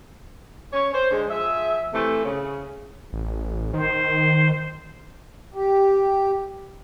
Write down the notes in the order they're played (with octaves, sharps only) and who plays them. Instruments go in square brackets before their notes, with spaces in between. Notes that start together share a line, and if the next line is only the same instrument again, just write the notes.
[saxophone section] C#4 C#5
C5
D3 G#3
F3 G#4 E5
C3 E3 A3
C#3
[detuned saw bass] A1
[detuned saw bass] D#3 [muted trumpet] C5
[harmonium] G4